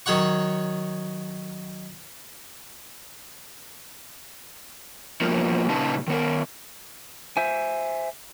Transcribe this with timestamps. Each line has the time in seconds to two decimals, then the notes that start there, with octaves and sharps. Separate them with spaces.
0.06 D#3 F#3 C#5 F#5 C#6
5.21 F3 A#3 B3 F4 F#4 A#4
5.69 A#2 C#3 C#4 D#4 B4 A5
6.08 D#3 B3 A#4
7.37 C5 E5 G#5